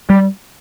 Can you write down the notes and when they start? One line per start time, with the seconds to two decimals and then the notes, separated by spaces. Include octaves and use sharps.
0.10 G3